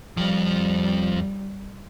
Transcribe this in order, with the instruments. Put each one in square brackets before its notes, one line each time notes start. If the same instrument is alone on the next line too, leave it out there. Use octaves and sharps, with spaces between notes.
[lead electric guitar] F2 F3 [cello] G3